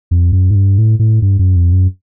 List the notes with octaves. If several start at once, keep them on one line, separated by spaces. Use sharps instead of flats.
F2
F#2
G#2
G2
A2
A2
G2
F#2
F2
F#2